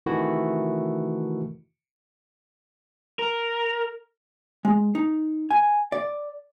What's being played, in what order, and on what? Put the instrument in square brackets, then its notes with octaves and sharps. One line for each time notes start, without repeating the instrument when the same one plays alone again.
[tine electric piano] C3 D#3 E3 A3 E4 F#4
[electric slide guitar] A#4
[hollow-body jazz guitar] G#3
D#4
G#5
D5